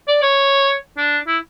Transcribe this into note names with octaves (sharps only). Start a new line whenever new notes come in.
D5
C#5
D4
E4